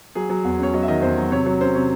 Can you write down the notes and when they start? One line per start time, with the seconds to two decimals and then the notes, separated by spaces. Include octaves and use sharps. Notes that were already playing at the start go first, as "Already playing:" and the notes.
0.15 F#3 G#4
0.30 F#3
0.44 E2
0.60 C#4 C#5
0.74 F#3 D#5
0.83 E5
0.88 D#3 D#5
1.02 E2 C5
1.17 F#3
1.31 C3 C#5
1.46 F#3 C#5
1.61 C#4 C5
1.75 C3 C#5